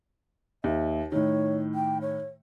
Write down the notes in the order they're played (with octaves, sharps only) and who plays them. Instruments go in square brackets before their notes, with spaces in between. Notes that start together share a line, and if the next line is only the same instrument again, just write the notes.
[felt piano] D#2 [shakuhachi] E5
[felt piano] A2 D#3 [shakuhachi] C#5
[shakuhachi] G5
C#5